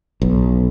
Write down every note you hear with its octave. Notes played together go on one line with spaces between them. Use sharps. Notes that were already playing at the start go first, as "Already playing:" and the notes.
B1